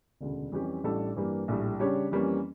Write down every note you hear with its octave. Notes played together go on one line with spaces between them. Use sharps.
E1 D2 C#3
F2 E3 G3 C#4 G4
A1 A2 G3 D4 A4
G2 E3 G3 A#3
A#1 A2 G3
C#3 G3 D4 G4 C#5
F2 E3 G3 A#3 C#4